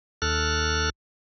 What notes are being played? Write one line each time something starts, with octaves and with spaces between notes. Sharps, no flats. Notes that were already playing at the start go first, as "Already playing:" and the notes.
D#2 A4 F6 F#6